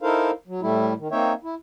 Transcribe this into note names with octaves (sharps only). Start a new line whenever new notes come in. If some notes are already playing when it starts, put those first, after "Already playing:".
D#4 E4 A4 A#4 C5 F5
F#3
A2 G3 A3 E4
D#3
A#3 C4 D#4 C#5 E5 G5
E4